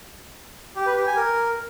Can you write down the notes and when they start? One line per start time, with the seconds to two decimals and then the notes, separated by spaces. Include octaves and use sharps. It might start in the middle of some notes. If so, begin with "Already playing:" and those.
0.76 G4
0.86 B4
0.96 G4
1.07 G#5
1.17 A#4